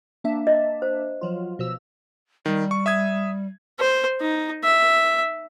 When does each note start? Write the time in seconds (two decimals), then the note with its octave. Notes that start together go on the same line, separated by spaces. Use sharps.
0.24 A#3 D4 E5
0.47 D#5
0.82 C5
1.21 F3 F#3 F4
1.59 B2 F3 E6
2.46 D#3 G3
2.71 C#6
2.86 E5 D#6 G#6
3.80 C5
4.21 D#4
4.64 E5